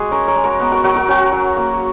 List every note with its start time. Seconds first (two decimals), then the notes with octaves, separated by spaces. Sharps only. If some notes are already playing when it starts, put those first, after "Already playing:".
Already playing: G#3 F#4 G#4
0.11 C#4 A#4 C#5
0.28 A#4 C#5
0.36 G#3
0.44 F#4 A#4
0.60 B3
0.72 F#4 A#4
0.84 F#3 F#4 A#4
0.96 F#4 A#4
1.08 C#4 F#4
1.32 F#3
1.57 A#3